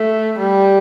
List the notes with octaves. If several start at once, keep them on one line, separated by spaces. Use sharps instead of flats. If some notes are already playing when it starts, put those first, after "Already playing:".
Already playing: A3
G3